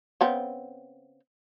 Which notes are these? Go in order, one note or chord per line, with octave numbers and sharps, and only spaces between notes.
C#3 B3 C4